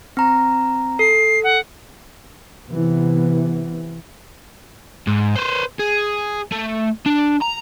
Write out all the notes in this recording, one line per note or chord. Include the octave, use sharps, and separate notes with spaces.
C4 A#5
A4 C7
F#5
C3 E3 B3
G#2
B4 C5
G#4
A3
D4
A#5